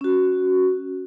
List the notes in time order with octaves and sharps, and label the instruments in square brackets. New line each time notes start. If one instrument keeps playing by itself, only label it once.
[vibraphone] C#4 F#4